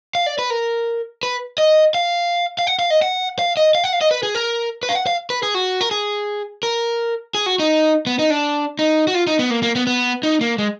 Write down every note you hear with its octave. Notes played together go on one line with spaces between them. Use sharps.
F5
D5
B4
A#4
B4
D#5
F5
F5
F#5
F5
D#5
F#5
F5
D#5
F5
F#5
F5
D#5
B4
G#4
A#4
B4
F5
F#5
F5
B4
G#4
F#4
A#4
G#4
A#4
G#4
F#4
D#4
B3
D#4
D4
D#4
F#4
F4
D#4
B3
A#3
A#3
B3
B3
D#4
A#3
G#3